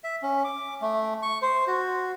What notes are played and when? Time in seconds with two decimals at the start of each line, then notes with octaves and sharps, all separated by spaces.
0.04 E5
0.23 C#4
0.44 D6
0.82 A3
1.22 C#6
1.42 C5
1.67 F#4